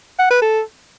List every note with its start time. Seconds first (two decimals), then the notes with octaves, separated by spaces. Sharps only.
0.19 F#5
0.30 B4
0.42 A4